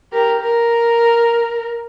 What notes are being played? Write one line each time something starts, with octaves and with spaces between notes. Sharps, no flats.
G4 A#4
A#4